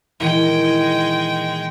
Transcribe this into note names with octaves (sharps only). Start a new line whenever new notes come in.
A#2 D#3 E3 G#3 G5